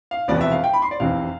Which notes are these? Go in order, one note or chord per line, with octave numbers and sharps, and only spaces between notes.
F5
E1 E2 C3 F3 B3 D5
E5
F5
G5
B5
C6
D5
F1 E2 C3 E3 F5